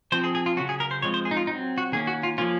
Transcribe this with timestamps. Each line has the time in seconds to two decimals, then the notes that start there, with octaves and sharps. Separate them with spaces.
0.12 F3 C4 C5
0.24 G#4
0.35 G#4
0.46 F4
0.57 C#3 F#3 C#4 F#4
0.69 G#4
0.80 A#4
0.91 C5
1.02 F3 G#3 C4 C#5
1.14 C5
1.25 G#4
1.31 D#4
1.37 F4
1.47 F#3 C4 D#4
1.78 F#4
1.92 D#3 A#3 C#4 G#4
2.07 F#4
2.23 F4
2.38 F3 A#3 C#4 F4